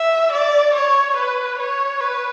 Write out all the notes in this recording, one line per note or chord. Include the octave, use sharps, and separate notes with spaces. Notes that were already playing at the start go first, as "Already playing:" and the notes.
Already playing: E5
D5
C#5
B4
C#5
B4